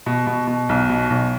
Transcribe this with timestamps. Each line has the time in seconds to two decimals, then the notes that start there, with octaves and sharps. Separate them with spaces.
0.06 B2
0.27 B2
0.47 B2
0.69 B1
0.90 B2
1.10 B1